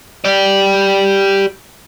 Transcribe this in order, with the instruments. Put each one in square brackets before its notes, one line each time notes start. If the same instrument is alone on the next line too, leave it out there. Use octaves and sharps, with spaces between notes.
[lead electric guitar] G4 D5